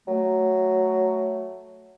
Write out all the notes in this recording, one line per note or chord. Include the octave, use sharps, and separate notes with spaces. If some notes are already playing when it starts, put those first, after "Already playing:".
F#3 A3